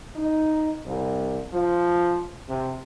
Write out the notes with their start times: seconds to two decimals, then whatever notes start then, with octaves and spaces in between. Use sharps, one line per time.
0.15 D#4
0.85 C2
1.52 F3
2.49 C3